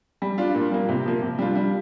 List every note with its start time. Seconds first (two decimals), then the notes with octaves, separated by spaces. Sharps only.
0.22 G3
0.38 D4 F4
0.55 A#2
0.72 G3 A#3
0.89 C3
1.06 F3 A#3
1.22 C3
1.39 G3 D4 F4
1.55 G3